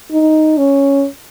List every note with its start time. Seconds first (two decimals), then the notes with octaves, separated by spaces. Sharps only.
0.12 D#4
0.57 C#4